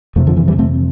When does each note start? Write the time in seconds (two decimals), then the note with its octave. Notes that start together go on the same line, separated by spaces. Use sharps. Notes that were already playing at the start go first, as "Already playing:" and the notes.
0.16 F2 C3 F3 A3
0.27 D3 F3
0.37 E3
0.48 E3 G3
0.59 A3 C4